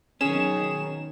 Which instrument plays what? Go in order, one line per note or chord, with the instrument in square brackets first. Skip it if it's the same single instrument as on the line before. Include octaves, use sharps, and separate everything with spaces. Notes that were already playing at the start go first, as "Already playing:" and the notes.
[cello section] B2 D#3 F#3 [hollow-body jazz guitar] C#4 [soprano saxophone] G#4 [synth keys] E7